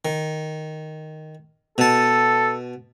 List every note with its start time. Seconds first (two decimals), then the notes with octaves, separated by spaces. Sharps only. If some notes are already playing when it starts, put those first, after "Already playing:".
0.05 D#3
1.78 B2 A4 A5